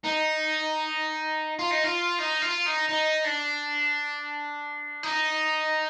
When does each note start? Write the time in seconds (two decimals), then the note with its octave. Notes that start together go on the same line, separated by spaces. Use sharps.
0.04 D#4
1.59 F4
1.71 D#4
1.84 F4
2.19 D#4
2.42 F4
2.66 D#4
2.89 D#4
3.24 D4
5.03 D#4